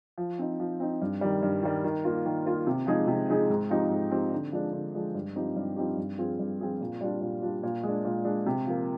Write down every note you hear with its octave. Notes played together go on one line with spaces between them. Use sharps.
F3
C4 D#4
F3
C4 D#4
G2
D#3 G3
G2
D#3 G3
D#3
A#3 F4
D#3
A#3 F4
C3
F3 G#3 D#4 G#4
C3
F3 G#3 D#4 G#4
G#2
F3 C4 D#4 G4
G#2
F3 C4 D#4 G4
D3
F3 G#3 D4
D3
F3 G#3 D4
G2
F3 C4 D#4 G4
G2
F3 C4 D#4 G4
G2
F3 C4 F4 G#4
G2
F3 C4 F4 G#4
A#2
G3 D4 F4
A#2
G3 D4 F4
A#2
G#3 D4
A#2
G#3 D4
C3
F3 A#3